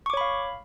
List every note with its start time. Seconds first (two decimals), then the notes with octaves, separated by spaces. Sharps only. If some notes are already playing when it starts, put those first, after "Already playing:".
0.06 C#6
0.10 D6
0.14 C#5
0.17 B5
0.21 F5